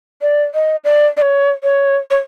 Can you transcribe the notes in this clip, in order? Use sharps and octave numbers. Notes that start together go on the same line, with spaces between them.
D5
D#5
D5
D5
C#5
C#5
C#5